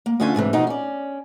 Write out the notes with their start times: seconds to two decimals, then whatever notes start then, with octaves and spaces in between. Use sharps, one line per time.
0.06 A#3
0.20 D2 D3 C#4 F4 E5 G#5
0.35 D2 G#2 C3 E3
0.53 B2 F3 D#4
0.67 C#4 D5